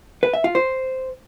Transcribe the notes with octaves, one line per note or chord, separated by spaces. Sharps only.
B4
E5
F4
C5